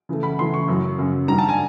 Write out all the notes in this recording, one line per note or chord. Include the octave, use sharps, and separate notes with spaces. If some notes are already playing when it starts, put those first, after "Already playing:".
C#3 E3 A3
B5
C#3 E3 A3 C6
C#6
F#2 C#3 F#3
F#2 C#3 F#3
G2 D#3 G3 A#5
A5
G#5